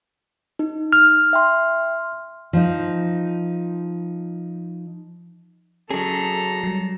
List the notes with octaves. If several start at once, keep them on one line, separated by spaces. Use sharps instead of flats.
D#4
F6
E5 G5 C6
F3 D#4
F#3 C#4 G#4 A4 A#5
F#3 G3